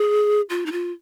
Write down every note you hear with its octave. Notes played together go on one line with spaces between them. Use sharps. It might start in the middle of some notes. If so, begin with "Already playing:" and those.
Already playing: G#4
F4
D#4
F4